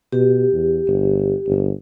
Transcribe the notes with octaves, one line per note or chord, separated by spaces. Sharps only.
B2 G4
E2
G1
G1